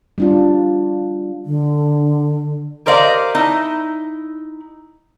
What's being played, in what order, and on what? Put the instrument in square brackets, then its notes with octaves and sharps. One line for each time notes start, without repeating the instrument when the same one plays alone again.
[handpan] G3 D4 F4
[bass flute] D3
[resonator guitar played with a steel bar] G4 A#4 C5 D5 D#5 F5
D#4 E4